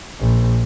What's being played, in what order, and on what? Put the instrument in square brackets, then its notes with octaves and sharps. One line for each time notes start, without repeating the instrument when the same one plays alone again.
[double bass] A#1